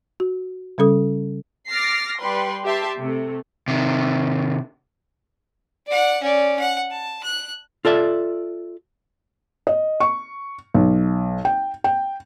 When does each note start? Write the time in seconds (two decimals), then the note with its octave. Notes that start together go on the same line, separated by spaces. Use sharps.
0.20 F#4
0.78 C#3 G3 C#4 A4 D#6
1.69 D6 F6 A6 A#6 C7
2.20 G3 B4 C6
2.65 G4 E5 A5 C6
2.99 C3 A3
3.68 C3 D#3
5.86 D5 F#5
6.22 C#4 D5
6.59 F#5
6.90 A5
7.23 F#6
7.85 F4 A4 D5 E5
9.67 D#5
10.00 C#6
10.74 B1
11.45 G5
11.84 G5